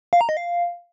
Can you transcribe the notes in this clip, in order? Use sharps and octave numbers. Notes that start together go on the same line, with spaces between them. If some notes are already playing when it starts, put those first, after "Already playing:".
F5
A#5
D#5
F5